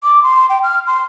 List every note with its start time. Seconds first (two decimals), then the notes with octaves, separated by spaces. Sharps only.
0.03 D6
0.23 C6
0.49 G5
0.63 F6
0.87 C6